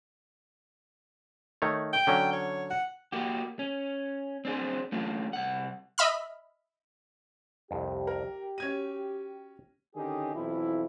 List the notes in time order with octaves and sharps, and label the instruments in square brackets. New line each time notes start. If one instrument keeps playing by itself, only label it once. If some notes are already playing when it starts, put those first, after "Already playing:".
[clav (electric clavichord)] D#3 A3 C#5
[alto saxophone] G5
[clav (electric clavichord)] D3 F#3 C#4
[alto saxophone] C#5
F#5
[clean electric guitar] A#3 F#4 G4
C#4
C4 D4 G#4 C5
A3 C#4 D4 F4
C2 F#5
[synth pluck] D#5 E5 B5 F6
[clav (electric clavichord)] C2 F2 [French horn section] G4
[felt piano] A#4
[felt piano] C#4 G#6 D#7 [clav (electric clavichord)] F#4
[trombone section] D3 D#3 C#4 D#4 G4 G#4
B1 F2 E3 F3 E4